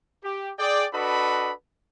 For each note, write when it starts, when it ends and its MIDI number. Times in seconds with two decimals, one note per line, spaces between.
0.23 0.52 67
0.58 0.86 68
0.58 0.86 74
0.58 0.86 79
0.93 1.51 62
0.93 1.51 66
0.93 1.51 69
0.93 1.51 71
0.93 1.51 75
0.93 1.51 83